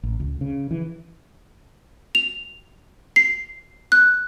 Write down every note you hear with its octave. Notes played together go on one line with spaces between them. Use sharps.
A1
C#2
C#3
E3
F7
C7
F#6